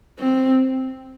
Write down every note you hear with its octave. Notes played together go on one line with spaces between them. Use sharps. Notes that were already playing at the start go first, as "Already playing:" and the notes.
C4